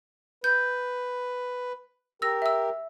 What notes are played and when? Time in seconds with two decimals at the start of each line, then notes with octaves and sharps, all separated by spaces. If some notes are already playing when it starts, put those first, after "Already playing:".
0.44 B4 G6
2.22 G4 A#4 E6 A#6
2.42 E5 E6